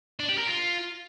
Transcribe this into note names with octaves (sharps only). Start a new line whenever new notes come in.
D4
G4
A#4
F4